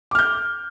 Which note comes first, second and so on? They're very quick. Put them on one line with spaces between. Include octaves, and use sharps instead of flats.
D6 F6 G6